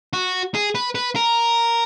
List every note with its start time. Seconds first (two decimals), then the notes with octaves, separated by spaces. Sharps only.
0.13 F#4
0.55 G#4
0.75 B4
0.95 B4
1.16 A#4